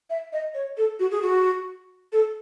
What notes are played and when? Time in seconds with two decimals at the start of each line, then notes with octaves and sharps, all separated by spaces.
0.10 E5
0.33 D#5
0.54 C#5
0.77 A4
1.00 F#4
1.11 G#4
1.22 F#4
2.12 A4